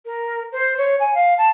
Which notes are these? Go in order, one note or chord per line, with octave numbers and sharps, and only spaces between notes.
A#4
C5
C#5
G#5
F5
A5